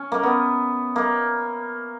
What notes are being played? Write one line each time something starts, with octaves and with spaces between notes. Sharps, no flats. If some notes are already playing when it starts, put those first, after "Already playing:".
Already playing: C#4
A#3
B3
A#3